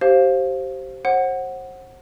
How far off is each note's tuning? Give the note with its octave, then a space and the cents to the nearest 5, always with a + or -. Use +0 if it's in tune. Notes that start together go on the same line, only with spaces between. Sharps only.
G4 -25 C5 +10 F5 +0
C5 +35 F#5 +0